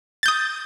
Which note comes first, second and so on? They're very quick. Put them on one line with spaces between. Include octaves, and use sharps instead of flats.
A6 G6 D#6